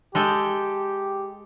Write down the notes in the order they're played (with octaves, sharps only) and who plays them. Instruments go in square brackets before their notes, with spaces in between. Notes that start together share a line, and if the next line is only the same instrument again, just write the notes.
[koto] G#3 A4 G5 [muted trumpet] G4